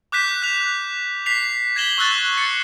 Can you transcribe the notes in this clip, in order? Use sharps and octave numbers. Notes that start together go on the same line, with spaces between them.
D6 F#6 G6 B6 E7
F#6 F7
B6 C7 F7
G#6 A#6 B6 E7 F#7 G7
C#6 E6 F#6 A6
A6 C7 C#7